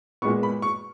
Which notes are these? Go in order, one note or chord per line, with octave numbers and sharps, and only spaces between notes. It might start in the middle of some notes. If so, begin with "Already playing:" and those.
A#2 G#3 B3 C#6
B5
C#6